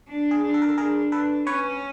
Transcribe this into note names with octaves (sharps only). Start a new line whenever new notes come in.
D4
G#4
D4
A4
A#4
A4
D4 G#4 A#4
A4 B4
C#4 B4 C#5